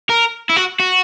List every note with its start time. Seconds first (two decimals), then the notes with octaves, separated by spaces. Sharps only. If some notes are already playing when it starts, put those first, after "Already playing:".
0.09 A#4
0.50 E4
0.57 F#4
0.80 F#4